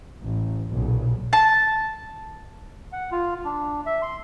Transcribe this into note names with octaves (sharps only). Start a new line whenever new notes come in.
A1
B1 A#2 C#3
A5
F#5
F4
D4
E5
C6